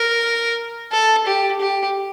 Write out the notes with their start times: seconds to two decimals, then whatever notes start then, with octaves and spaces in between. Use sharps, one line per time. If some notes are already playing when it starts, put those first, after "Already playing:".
Already playing: A#4
0.92 A4
1.27 G4
1.61 G4